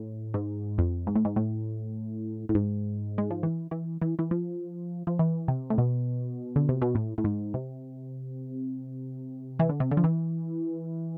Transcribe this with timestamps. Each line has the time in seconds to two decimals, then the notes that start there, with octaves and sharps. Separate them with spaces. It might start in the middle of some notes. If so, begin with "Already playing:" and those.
Already playing: A2
0.34 G#2
0.78 F2
1.07 G#2
1.15 A2
1.25 G#2
1.36 A2
2.49 A2
2.55 G#2
3.18 G#3
3.31 F3
3.43 E3
3.71 E3
4.02 E3
4.19 E3
4.31 F3
5.07 F3
5.19 E3
5.48 C3
5.70 A2
5.78 B2
6.56 D3
6.69 C3
6.82 B2
6.95 A2
7.18 A2
7.24 G#2
7.54 C3
9.59 E3
9.69 D3
9.80 C3
9.91 D3
9.97 F3
10.04 E3